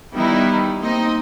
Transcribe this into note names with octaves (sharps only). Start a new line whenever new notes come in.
D#3 G3 B3 D#4 E4
A#3 C4 D#4 D#5